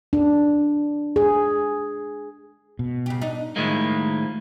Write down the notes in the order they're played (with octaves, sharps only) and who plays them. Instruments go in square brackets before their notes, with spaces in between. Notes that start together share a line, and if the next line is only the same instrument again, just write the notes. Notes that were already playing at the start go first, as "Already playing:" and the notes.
[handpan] D4
G#4
[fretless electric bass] B2
[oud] C#3 G4
D4 D#4
[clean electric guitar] A2 D#3 F3 G3 G#3 A#3